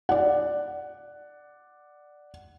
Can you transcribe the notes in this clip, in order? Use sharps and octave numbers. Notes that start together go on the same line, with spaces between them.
D5 F#5